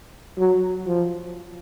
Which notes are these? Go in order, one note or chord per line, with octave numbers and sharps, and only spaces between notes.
F#3
F3